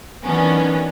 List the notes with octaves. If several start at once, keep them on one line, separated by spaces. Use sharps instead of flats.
D#3 E3 F#3 B3 C#4 D4